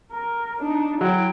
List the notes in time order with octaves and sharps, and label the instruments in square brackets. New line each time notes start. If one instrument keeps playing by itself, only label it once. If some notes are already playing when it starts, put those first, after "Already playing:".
[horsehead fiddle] A#4
D4 D#4
[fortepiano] F#3 [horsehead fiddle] E4 G5